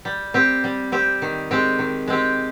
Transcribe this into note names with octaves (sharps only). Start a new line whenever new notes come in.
G3
C4 G4
G3
C4 G4
D#3
G#3 C4 G4
D#3
G#3 C4 G4